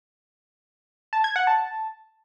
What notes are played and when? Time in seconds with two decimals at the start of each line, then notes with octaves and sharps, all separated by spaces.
1.13 A5
1.24 G#6
1.36 F#5
1.47 A5